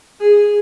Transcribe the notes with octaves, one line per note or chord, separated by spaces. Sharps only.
G#4